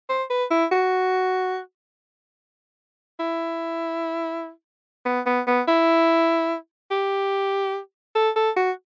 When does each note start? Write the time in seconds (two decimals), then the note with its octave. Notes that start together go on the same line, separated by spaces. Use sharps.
0.09 C5
0.30 B4
0.51 E4
0.72 F#4
3.20 E4
5.06 B3
5.26 B3
5.47 B3
5.68 E4
6.91 G4
8.15 A4
8.36 A4
8.56 F#4